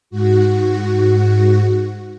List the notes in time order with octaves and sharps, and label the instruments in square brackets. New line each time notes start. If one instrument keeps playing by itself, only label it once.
[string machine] G#2 F#4